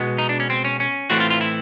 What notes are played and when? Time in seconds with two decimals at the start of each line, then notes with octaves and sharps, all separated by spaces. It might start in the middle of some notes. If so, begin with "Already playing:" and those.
Already playing: B2 G#3 B3
0.18 D#4
0.29 D4
0.40 C#4
0.50 C4
0.65 C#4
0.80 C#4
1.10 A2 E3 A3 C4 F#4
1.20 F4
1.30 F4
1.41 E4